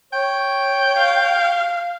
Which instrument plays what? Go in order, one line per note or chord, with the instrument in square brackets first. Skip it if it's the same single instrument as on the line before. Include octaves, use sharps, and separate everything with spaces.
[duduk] C#5 [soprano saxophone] G5
[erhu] F5